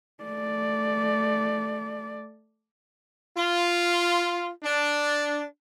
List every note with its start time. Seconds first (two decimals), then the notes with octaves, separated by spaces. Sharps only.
0.24 A3 D5
3.38 F4
4.64 D4